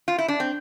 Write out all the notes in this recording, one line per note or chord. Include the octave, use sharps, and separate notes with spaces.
F4
E4
D4
C4